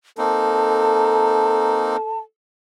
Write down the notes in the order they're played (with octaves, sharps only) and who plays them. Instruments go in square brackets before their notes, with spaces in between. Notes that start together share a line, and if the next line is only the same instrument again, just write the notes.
[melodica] A#3 C4 D#4 [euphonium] A4 [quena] A5